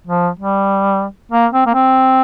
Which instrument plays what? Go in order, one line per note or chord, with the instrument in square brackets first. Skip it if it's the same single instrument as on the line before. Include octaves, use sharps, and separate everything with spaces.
[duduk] F3
G3
A#3
C4
A#3
C4